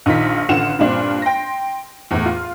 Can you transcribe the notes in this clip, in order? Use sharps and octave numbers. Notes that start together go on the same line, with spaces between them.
A#1 D#3 F4 B6
A1 D3 F4 F#5 E7
G2 A#2 C4 D4 F4
G5 C6 A#6
E2 A2
F4